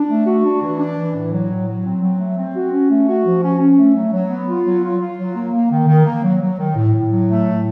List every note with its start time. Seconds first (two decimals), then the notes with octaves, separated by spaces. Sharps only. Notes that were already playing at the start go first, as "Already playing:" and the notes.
Already playing: D4
0.09 A3
0.27 F#4
0.44 D4
0.62 E3
0.79 D4
0.97 E3
1.14 A2
1.32 F#3
1.50 A2
1.67 F#3
1.84 C4
2.02 F#3
2.19 A3
2.37 C4
2.55 F#4
2.72 C#4
2.90 A3
3.08 F#4
3.25 F3
3.43 C#4
3.60 C#4
3.77 A3
3.95 F#3
4.12 F#3
4.30 B3
4.48 F4
4.65 F#3
4.83 F4
5.00 F4
5.18 F#3
5.36 A#3
5.53 A#3
5.71 D#3
5.88 D#3
6.06 A#3
6.23 F#3
6.41 F#3
6.59 D#3
6.76 A2
6.94 A2
7.11 F#3
7.28 A3
7.47 A2